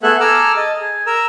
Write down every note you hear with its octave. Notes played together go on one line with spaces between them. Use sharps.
A3 B3 G#4 A4 E5 F#6
G#4 A4 A#5 D6 E6 F6
D#5 A5
G#4
A#4 A#5 E6